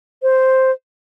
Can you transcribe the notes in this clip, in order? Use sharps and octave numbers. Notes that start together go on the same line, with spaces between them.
C5